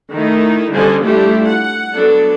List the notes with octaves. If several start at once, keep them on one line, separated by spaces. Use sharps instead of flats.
D#3 A3 D#4 E4
D3 G3 C#4 C5 D#5 G#5
G3 A3 D4 E4 F4 G4
F#5
F#3 B3 D4 A4